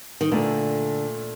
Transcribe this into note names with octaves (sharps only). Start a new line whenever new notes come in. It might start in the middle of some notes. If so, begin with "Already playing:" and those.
D#3
A#2 D3 A3 D4 A4